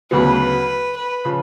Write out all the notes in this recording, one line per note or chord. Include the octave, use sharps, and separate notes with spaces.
D2 C#3 F#3 B3 B4
B4
C#3 F3